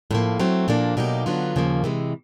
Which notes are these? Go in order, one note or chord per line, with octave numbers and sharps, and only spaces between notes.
A2 F3 A#3
F#3 A3 C4
A#2 F3 A#3 D4
B2 F#3 A#3 D#4 G4
D3 F#3 B3 D4 F4
D#2 C#3 F3 A#3
C3 E3 G#3